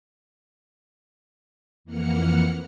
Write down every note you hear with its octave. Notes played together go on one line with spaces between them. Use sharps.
F2 E3 A#3 F#5 F6 C#7